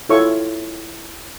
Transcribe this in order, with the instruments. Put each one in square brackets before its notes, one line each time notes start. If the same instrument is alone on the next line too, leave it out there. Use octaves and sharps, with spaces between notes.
[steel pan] E4 F4 A4 C#5 C#6